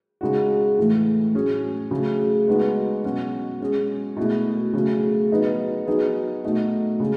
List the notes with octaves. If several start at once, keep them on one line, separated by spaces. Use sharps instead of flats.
C#3 G#3 D#4 F#4
A2 E3 A3
A2 F#3 C#4 G#4
C#3 F#3 A3
G#3 B3 D#4 F#4
B2 F#3 C#4 F#4
G#3 C#4 G#4
B2 A3 E4 G#4
C#3 F#3 A3 C#4
F#3 B3 D#4 G#4
F#3 B3 D#4 G#4
B2 A3 D#4 F#4
C#3 G#3